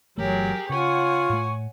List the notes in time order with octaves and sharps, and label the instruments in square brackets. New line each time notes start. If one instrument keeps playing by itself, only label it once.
[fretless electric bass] G1 E3 A3 [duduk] F#3 [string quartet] G4 G#4 A#4 [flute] C#5
[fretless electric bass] C#3 [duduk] F4 [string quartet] C#5 F#5 G#5 [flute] C#6
[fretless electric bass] A2 A3